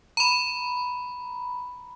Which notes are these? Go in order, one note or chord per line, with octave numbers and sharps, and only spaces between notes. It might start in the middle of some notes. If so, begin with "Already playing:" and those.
A#5 B5